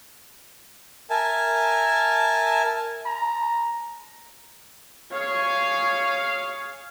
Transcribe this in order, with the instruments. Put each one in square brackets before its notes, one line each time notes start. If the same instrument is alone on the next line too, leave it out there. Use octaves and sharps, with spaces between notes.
[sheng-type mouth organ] A#4 E5 G#5 A5
[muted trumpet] A#5
[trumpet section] G#4 F5 [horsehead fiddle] C#5